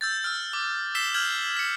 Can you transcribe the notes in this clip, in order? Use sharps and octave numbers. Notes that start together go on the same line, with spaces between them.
E6 G6 A6
E6 F6
D6
E6 G6 B6 C7 E7 G7
F6 G6 G#6 F#7
B6 C#7